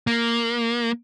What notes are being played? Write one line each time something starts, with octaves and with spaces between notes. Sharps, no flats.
A#3